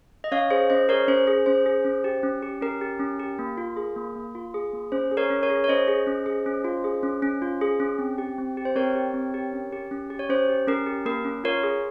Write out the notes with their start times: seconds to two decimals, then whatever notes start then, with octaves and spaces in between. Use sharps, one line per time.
0.24 D#5
0.32 C#4 C#5 F5
0.51 G#4 C5
0.70 C#4 C5 D#5
0.89 G#4 A#4 C#5
1.08 C#4 C5
1.27 G#4
1.46 C#4 C5
1.66 G#4
1.85 C#4
2.04 G4
2.23 C#4
2.42 G4
2.61 C#4 A#4
2.81 G4
3.00 C#4
3.20 G4
3.39 A#3
3.58 F4
3.77 G#4
3.96 A#3
4.15 A#3
4.35 F4
4.54 G#4
4.73 A#3
4.92 C#4 C5
5.11 G#4
5.17 A#4 C#5
5.30 C#4
5.43 A#4 C#5
5.50 G#4
5.64 C#5
5.68 C#4 C5 D#5
5.88 G#4
6.07 C#4
6.26 G#4
6.46 C#4
6.65 F4
6.84 G#4
7.03 C#4
7.22 C#4
7.42 F4
7.61 G#4
7.80 C#4
7.98 C4
8.18 G4
8.38 C4
8.57 G4
8.65 C5
8.75 C4 A#4 C#5
8.95 G4
9.14 C4
9.34 G4
9.53 C#4
9.72 G4
9.91 C#4
10.10 G4
10.19 C#5
10.29 C#4 C5
10.49 G4
10.67 C#4 A#4
10.86 G4
11.05 A#3 A#4
11.25 C#4
11.44 F4 A#4 C#5
11.63 G#4